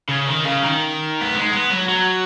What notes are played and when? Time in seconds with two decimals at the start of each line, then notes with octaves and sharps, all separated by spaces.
0.09 C#3
0.27 D#3
0.45 C#3
0.63 D#3
1.21 B3
1.35 G#3
1.53 B3
1.71 F#3
1.89 F#3